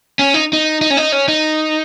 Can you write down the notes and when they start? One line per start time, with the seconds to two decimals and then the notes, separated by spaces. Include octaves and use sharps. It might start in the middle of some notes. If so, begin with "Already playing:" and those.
0.19 C#4
0.34 D#4
0.53 D#4
0.82 D#4
0.90 C#4
0.97 D#4
1.12 C#4
1.28 D#4